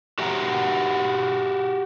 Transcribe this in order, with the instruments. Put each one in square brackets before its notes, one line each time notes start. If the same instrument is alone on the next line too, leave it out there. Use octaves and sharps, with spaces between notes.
[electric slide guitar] F#4 G4 E5 F#5 G5 A#5